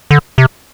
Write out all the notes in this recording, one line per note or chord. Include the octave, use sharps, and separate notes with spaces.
D3
C3